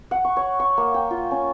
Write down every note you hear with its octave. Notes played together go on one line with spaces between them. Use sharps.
F#5
C#6
C#5
C#6
A#3
G5
F4
C#4